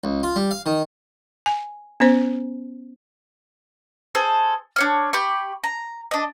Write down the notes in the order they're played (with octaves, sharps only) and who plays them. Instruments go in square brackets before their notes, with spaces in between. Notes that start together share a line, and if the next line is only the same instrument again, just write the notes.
[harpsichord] C#2
F4
G3
F5
D#3
[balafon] G#5
B3 C#4 C5
[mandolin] G#4 A4 C5
D4 C#5 F6
G4 B5 C#6
A#5
D4 D#5